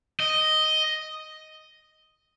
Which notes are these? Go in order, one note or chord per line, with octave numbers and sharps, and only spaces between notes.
D#5